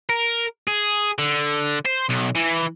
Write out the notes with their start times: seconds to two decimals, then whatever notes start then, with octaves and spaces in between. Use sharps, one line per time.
0.10 A#4
0.68 G#4
1.19 D3
1.85 C5
2.09 B1
2.35 E3